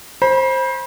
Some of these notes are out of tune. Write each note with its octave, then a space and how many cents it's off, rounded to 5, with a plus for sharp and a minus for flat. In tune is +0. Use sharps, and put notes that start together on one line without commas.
C5 +15 B5 -35